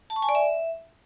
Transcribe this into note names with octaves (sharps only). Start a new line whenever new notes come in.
A5
C#6
G#5
D5
E5